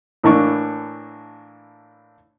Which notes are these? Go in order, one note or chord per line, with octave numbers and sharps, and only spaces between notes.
A2 E3 A#3 D4 C#6